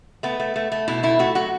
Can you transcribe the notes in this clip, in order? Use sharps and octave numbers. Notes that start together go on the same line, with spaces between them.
A3 B3
A3
A3
A3
B2 E4
A3 E4
A3 F#4
F#3 F#4